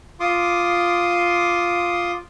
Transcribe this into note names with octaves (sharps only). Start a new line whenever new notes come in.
F4 C6 D6 D#6